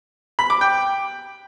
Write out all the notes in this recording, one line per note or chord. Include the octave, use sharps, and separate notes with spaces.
B5
D6
G5